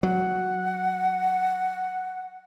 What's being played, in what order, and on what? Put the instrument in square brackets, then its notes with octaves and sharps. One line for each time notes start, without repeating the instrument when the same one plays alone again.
[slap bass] F#3 [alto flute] F#5